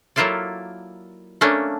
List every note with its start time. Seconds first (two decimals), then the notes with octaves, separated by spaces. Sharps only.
0.16 F#3 A#3 E4 F4 A4 D5
1.41 A3 A#3 C#4 D4